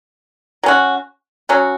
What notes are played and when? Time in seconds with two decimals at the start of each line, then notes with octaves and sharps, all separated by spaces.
0.63 F#3 C#4 F#4
1.49 F#3 C#4 F#4